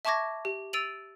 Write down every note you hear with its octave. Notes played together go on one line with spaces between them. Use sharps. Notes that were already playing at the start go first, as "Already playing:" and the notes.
E5 A5 C#6 D6 G#6 A#6
G4
E6 A6 D7 D#7 F7 F#7